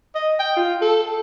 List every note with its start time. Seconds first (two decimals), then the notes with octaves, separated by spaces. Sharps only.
0.15 D#5
0.40 G5
0.57 F4
0.82 A4